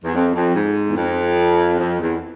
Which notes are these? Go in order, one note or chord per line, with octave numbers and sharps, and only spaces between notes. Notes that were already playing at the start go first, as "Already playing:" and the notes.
E2
F2
F2
G#2
E2
F2
F2
E2